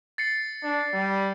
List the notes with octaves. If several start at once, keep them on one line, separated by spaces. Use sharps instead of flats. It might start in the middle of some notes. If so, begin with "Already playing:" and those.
A6 C7 C#7
D4
G3